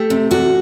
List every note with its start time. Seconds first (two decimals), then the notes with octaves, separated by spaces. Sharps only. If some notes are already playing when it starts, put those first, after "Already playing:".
Already playing: A3 G4
0.10 C3
0.31 E2 F#4